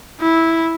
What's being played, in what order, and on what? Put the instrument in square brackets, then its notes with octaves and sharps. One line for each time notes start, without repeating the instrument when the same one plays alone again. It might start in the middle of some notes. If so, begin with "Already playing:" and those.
[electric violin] E4